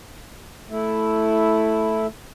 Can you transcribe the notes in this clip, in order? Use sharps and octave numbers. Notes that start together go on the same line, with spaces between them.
A3 E4